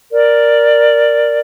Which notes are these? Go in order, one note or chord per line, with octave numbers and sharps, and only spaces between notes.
A#4 D5